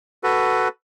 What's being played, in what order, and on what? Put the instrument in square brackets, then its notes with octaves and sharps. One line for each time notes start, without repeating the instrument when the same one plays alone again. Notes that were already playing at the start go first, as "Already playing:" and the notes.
[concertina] F#4 A4 B4